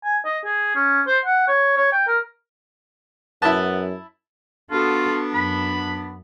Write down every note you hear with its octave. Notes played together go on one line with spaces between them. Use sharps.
G#5
D#5
G#4
C#4
C5
F#5
C#5
C#5
G5
A#4
F#2 B3 E4 A5
B3 D4 F4 F#4 A4
F#2 B5